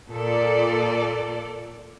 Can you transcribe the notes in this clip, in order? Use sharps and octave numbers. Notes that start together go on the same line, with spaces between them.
A#2 A4 D5